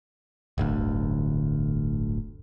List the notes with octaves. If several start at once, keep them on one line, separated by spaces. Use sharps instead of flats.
D1 G1 D2